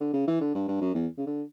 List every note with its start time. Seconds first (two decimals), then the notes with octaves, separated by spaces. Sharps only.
0.01 D3
0.13 C#3
0.27 E3
0.41 D3
0.55 G2
0.68 G2
0.81 F#2
0.95 E2
1.18 C#3
1.26 D3